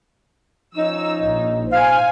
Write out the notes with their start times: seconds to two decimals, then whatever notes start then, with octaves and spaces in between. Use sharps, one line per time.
0.75 F3 C#4 D#4 E6
1.21 A#1
1.72 C5 F5 G#5